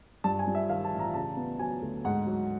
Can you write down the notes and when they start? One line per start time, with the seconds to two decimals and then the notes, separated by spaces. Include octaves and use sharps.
0.24 G2 A5
0.39 G#5
0.47 G3
0.55 E5
0.69 D#3 F5
0.85 A5
0.92 A1
0.99 A#5
1.14 C#3 A5
1.37 B3
1.59 F#3 G#5
1.82 D2
2.05 G#2 F#5
2.27 F#3